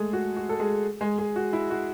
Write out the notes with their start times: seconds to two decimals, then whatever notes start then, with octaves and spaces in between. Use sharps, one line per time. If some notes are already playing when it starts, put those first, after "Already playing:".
Already playing: G#3 A3 G#4 A4
0.13 F#4
0.36 F#4
0.49 A4
0.59 G#3 G#4
1.01 G#3 G#4
1.18 G#3 G#4
1.36 F#4
1.53 E4
1.71 F#4